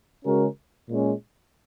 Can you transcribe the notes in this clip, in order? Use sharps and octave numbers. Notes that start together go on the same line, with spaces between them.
C#3 G#3 C#4 F#4 A#4
A#2 G#3 C#4